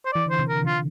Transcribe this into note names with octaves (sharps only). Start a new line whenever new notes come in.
C5
E3 D5
D3 C5
C3 E3
D3 A#4
D3 F4